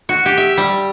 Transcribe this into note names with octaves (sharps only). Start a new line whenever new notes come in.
F#4
G4
E5
G3